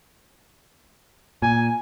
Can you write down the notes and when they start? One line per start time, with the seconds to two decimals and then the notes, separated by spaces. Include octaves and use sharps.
1.42 A#2 G#5